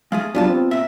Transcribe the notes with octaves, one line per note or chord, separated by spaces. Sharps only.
G#3 A3 G#4 F5
F#3 G3 B3 D4 F4 A5
C4
A#2 E5